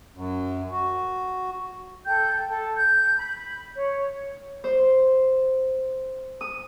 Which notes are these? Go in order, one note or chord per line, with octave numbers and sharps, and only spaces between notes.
F#2
F#4
A4 G5 G6
A4
G6
B5
C#5
C5
D#6